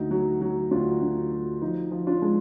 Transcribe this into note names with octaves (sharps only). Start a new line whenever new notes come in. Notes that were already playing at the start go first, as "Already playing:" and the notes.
Already playing: D2 D#4 F#4
F#3
F#3
D2 D4 F4
D2
F#3
F3 D#4
F3
D4 F4
G#3